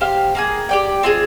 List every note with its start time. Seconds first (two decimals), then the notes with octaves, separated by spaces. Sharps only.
0.01 G4 C5 F5
0.35 A#3 F4 G#4
0.69 G4 D5 G5
1.03 C4 F4 G#4